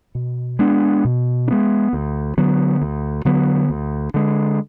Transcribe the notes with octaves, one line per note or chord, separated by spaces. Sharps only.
B2
G#3 B3 D4
B2
D4
G#3 B3
D2
D3 F#3 B3
D2
D3 F#3 B3
D2
D3 G#3